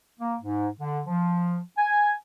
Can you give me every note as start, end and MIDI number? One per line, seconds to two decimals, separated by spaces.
0.20 0.36 58
0.41 0.69 44
0.79 1.01 50
1.07 1.59 53
1.78 2.13 80